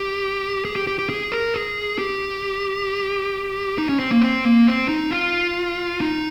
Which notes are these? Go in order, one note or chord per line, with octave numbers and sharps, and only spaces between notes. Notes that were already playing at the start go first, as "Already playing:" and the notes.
Already playing: G4
G#4
G4
G4
G4
G#4
A#4
G#4
G4
D#4
C#4
C4
A#3
C4
A#3
C4
D#4
F4
D#4